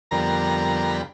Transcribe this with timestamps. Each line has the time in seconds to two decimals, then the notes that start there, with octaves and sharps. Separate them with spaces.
0.11 F2 D3 G3 B3 A#4 A#5
0.90 B5